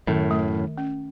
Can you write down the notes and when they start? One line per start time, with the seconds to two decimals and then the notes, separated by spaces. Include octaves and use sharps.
0.07 F#2 A2 D#3
0.31 A3
0.54 D#3
0.78 C#4